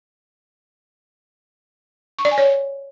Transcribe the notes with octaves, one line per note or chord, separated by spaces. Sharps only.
C#6
D5
G#5
C#5